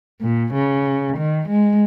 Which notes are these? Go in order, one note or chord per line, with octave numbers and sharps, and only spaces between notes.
A#2
C#3
D#3
G#3